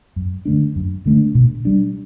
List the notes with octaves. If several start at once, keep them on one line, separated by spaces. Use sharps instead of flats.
F#2
D3 A3 D4
F#2
D3 A3 D4
B2
G3 D4